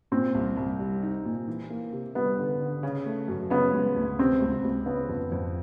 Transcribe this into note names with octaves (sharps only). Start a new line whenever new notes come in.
A#2 C4
C2
C2
G3
D#4
A#2
E3
A#3
C3
G3 B3
D3
D3
C#3
A3
F#2
C#3 B3
G#3
D2
C3 C4
C#2
C#2
C#3 B3
F2
F2